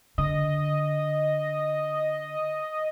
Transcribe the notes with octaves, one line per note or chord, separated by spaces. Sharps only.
D3 D#5